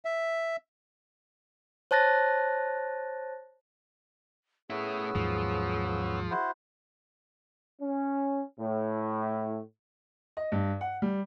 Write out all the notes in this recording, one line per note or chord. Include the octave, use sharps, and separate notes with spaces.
E5
C5 C#5 A5 F#6 A6 A#6
A3 B3 C#4 E4 G#4 E6
D#2 G#2 F3 F#3
E4 F#4 C5
C#4
A2
D#5
G2
F#5
G3